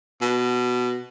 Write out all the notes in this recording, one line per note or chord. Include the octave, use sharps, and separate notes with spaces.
B2